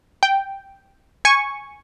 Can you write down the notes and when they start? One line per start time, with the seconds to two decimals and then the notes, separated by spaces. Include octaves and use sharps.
0.23 G5
1.25 G#5 C#6